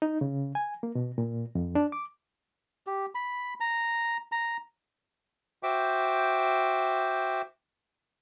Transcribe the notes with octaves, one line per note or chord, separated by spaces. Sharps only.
D#4
C#3
G#5
A#3
B2
A#2
F2
D4
D6
G4
B5
A#5
A#5
F#4 C5 E5 G5 D6